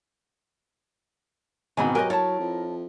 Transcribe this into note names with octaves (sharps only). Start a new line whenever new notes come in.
E1 G#2 B2 D#3 C4 G#5 B5
F#3 G4 A#4 B4 D#5 G#5
E4 A4 C#5 A5
F2